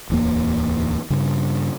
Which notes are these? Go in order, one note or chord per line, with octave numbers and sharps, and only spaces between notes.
D1 E2 A#3
G2 C#3